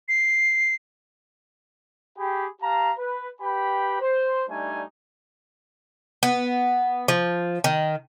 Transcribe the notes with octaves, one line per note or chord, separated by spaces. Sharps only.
C7
G4 G#4 G5 B5
G4 F5 A5 A#5
B4
G4 B4 G5 B5
C5
G3 A3 D4 D#4 G#5
B3
F3
D#3